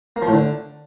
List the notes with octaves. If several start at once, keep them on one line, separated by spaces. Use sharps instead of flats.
A#3
F3
A2
D3